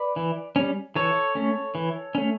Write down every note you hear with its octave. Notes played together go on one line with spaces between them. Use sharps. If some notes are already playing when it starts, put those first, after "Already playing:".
Already playing: B4 D5
E3
G3 C#4
E3 A4 C#5
A3 C#4
E3
A3 C#4